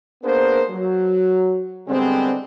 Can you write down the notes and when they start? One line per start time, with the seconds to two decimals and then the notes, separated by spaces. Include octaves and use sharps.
0.24 A#3 B3 D4 G#4 A#4 C5
0.70 F#3
1.88 D3 G3 G#3 B3 C4